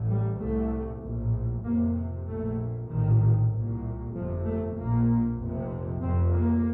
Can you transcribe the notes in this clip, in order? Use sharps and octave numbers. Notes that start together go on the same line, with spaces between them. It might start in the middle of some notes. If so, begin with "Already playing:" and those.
Already playing: A1 A2
G3
C2 C3 A3
A#1 A2
F1 F2 C3 A#3
A#1 A#2 A3
A#1 A2 D#3
C2 A#2
G1 F2 C3 F3
A3
A#1 A#2 A#3
F1 F2 C3
F1 F2 C3 C4
A#3